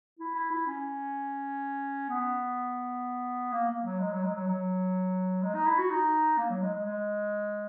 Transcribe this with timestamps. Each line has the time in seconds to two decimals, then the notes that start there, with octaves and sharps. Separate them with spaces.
0.19 E4
0.34 E4
0.51 E4
0.67 C#4
2.09 B3
3.52 A#3
3.69 A#3
3.84 F#3
4.00 G#3
4.12 F#3
4.24 G#3
4.35 F#3
4.48 F#3
5.43 G#3
5.55 D#4
5.67 E4
5.78 F#4
5.90 D#4
6.38 A#3
6.50 F#3
6.62 G#3
6.74 G#3
6.86 G#3